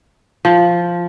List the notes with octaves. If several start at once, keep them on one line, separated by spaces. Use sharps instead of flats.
F3